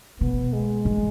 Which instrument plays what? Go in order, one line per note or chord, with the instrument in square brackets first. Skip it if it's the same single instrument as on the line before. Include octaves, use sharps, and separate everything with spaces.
[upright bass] B2 [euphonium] B3
[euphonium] G#3
[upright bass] G#2